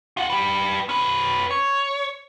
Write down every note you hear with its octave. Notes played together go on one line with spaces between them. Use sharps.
F4 F#5
G4 B4
C#4 B4
C#5